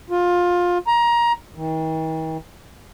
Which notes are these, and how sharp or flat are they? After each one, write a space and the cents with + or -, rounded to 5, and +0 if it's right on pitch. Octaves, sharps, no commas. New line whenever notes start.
F4 +20
A#5 +20
D#3 +45